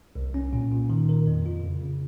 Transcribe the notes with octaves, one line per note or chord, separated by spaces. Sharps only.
C2
C#4
A#2
A#2
D#3
A#4
F2
F4
C#3
C#3